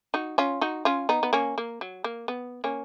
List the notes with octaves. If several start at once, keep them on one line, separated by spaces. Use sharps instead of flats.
D#4 F#4
C#4 F4
D#4 F#4
C#4 F4
B3 D#4
B3
A#3 C#4
A#3
F#3
A#3
B3
A#3 C#4